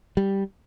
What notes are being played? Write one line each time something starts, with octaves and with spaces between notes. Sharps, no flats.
G3